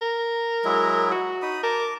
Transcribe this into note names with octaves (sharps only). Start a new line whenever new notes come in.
A#4
F#3 G#3 E4
F#4
D#4 B5 D#6
A#4 A5 D6